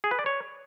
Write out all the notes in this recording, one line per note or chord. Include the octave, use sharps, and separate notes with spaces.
G#4
B4
D5
C#5